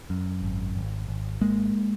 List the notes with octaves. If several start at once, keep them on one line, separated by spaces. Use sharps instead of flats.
F#2
G#1
G#1
G#1
G#1 G#3 A#3